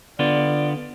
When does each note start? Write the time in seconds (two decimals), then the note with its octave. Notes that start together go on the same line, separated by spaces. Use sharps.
0.19 D3 B3 F4 D5